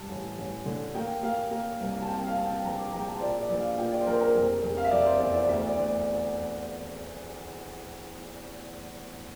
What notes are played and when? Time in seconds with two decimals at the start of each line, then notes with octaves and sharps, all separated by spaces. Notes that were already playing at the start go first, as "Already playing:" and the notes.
Already playing: G2 A5
0.09 A1
0.38 A1
0.66 D3
0.94 A#3 G5
1.23 A#3 F5
1.51 A#3
1.80 C2
2.02 A5
2.08 C4 G5
2.26 F5
2.36 C4 A5
2.46 G5
2.65 A#1 A#5
2.78 D6
2.92 A#1 A#5
3.00 G5
3.08 A5
3.17 C5
3.21 A#2 D5
3.40 D5
3.49 A#1
3.59 F5
3.78 A#2 G5
3.92 D5
4.01 C5
4.06 A#1 A#4
4.13 C5
4.21 A#4
4.35 F1
4.63 F1
4.77 F5
4.84 E5
4.91 F1 D5
5.06 C5
5.20 E2 D5
5.34 D5
5.48 D2 E5
5.67 D5
5.76 D2
5.86 D5
6.04 D5